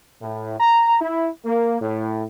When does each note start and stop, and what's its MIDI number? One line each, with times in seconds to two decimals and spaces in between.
0.22 0.55 45
0.60 0.97 82
1.01 1.28 64
1.46 1.80 58
1.81 2.24 45